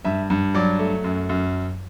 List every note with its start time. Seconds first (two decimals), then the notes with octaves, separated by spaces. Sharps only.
0.05 G2 E5
0.30 G2
0.55 F#3 D5
0.79 A3
1.04 F#2
1.29 F#2